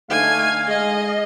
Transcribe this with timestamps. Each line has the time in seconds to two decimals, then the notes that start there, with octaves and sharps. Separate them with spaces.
0.10 D3 A3 D#4 F5 G#5
0.68 G#3 G#4 D#5